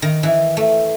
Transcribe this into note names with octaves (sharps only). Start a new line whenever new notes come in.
D#3
E3
A3